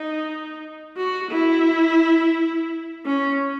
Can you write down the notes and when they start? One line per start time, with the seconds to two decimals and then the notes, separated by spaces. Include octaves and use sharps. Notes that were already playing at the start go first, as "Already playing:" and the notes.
Already playing: D#4
0.97 F#4
1.32 E4
3.06 C#4